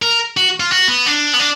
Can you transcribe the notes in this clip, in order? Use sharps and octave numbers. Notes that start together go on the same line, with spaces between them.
A#4
F#4
F4
F#4
B3
D4
B3
D4